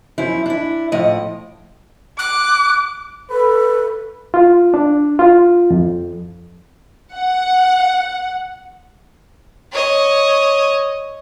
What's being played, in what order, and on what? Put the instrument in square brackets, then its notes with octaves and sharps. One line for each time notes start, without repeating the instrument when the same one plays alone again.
[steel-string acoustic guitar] F#2 F3 E4
D4 E4
A2 F3 D#5
[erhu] D6 [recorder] F#6
[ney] A4 [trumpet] B4
[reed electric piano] F4
D4
F4
F2
[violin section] F#5
[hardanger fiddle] C#5 D#5